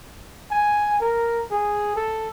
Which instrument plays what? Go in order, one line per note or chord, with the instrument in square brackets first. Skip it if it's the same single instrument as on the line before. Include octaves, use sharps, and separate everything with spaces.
[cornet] G#5
A#4
G#4
A4